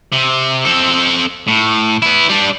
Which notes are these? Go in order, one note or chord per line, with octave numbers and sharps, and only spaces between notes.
C3
C4 A4
A2
B3 E4
G3 D4